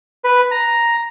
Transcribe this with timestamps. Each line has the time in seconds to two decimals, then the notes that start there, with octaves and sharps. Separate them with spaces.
0.24 B4
0.51 A#5